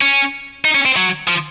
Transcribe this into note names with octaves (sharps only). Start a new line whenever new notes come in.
C#4
D#4
C#4
C4
F#3
F3